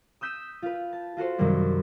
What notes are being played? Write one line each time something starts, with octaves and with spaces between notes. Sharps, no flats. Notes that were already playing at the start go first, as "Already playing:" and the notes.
D#6 E6 G6 B6 D#7 E7
F4 B4
A5
F4 F#4 A4 C5
F#2 C3 D#3 G3 A#3 D4